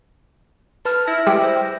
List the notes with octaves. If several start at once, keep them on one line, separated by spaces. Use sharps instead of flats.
B4 A5 F6
E4 A#6
G3 G#3 G4 G5
C5